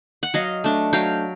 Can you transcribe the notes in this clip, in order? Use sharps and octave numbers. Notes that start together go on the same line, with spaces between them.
F#5
F#3 D#5 F5
A3 D4
F#3 F5 G5